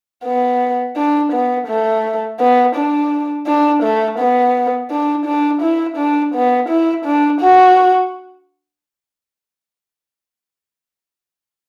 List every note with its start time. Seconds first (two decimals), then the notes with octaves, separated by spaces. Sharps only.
0.25 B3
0.97 D4
1.33 B3
1.68 A3
2.40 B3
2.76 D4
3.47 D4
3.83 A3
4.19 B3
4.91 D4
5.26 D4
5.62 E4
5.98 D4
6.34 B3
6.69 E4
7.05 D4
7.41 F#4